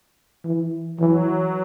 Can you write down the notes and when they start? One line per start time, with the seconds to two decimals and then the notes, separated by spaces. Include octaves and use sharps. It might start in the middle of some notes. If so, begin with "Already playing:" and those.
0.45 E3
1.00 E3 F#3